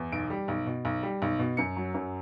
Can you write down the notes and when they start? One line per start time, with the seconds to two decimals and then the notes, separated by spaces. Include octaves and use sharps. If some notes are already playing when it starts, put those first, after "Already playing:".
Already playing: E2
0.12 B1 D7
0.30 G3
0.48 B1
0.66 B2
0.85 B1
1.03 G3
1.22 B1
1.39 B2
1.57 F#2 C#7
1.77 F#3
1.94 F#2